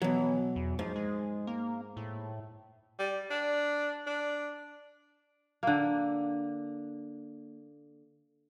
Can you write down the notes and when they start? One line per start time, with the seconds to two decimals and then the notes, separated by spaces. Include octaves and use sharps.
0.02 B2 E3 F#3
0.56 E2
0.79 G#2 F3
0.96 G#3
1.47 A#3
1.97 A2
2.99 G3
3.30 D4
4.06 D4
5.63 D3 A#3